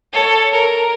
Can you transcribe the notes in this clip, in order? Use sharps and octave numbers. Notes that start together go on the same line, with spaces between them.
A4 C#5
A#4